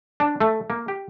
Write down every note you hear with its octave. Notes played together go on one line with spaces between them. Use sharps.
D4
A3
A#3
G4